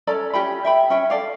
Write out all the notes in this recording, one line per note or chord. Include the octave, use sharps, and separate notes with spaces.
C#4 A4 D5 A#5
C#4 G4 G5 B5
E5 G5 B5
C#4 E5 G5
A4 D5 F5